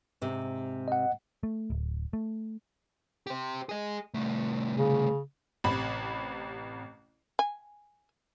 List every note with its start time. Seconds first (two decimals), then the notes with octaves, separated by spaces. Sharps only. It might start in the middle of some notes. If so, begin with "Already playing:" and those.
0.21 G#2 C3
0.88 D#5 F#5
1.43 A3
1.70 D1
2.13 A3
3.27 G4 C5
3.69 G#4 D#5
4.14 C2 A3
4.75 C#3
5.64 A1 C3 B5
7.39 G#5